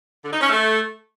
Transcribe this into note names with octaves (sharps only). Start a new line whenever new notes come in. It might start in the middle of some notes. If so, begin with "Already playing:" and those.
D3
D#4
C#4
A3